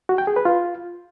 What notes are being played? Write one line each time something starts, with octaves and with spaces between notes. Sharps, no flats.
F#4
G5
G#4
B4
F4